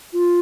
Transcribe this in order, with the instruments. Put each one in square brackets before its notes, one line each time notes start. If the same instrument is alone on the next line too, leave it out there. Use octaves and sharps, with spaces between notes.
[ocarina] F4